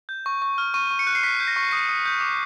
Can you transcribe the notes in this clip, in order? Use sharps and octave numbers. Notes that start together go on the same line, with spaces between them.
G6
C#6
C#6
F6
C#6 D#7
C#6
C#7
F#6
C7
C#6 B6
G6
A#6
C#6
D#6 C7
D#6
G6
D6